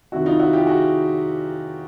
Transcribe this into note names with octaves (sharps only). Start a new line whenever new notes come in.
F2 C3 D#3 E4 F#4
D#4 F4
E4 F#4
F4 G4
F#4 G#4